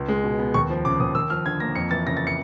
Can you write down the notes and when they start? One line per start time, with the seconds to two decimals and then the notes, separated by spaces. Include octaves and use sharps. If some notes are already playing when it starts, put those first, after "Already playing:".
Already playing: C#2
0.08 G#3
0.24 B2
0.39 B3
0.54 D#2 C#6
0.70 F3
0.85 C#3 D6
1.00 D#2 D#6
1.15 D#2 E6
1.30 F3 F6
1.46 D3 G#6
1.60 A#3 A#6
1.75 F2 C#7
1.91 E3 A6
2.07 C#3 A#6
2.17 A6
2.27 C#7